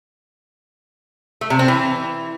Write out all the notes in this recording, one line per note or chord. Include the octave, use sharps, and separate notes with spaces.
A3
C3
C4
E3